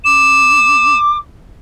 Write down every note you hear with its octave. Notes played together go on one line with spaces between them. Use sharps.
D6 E7